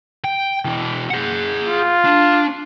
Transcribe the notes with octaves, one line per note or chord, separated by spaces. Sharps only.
G5
B2 E3
G#4 F#5
F4
D4